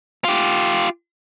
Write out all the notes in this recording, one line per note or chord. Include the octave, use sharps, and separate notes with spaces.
F4 G4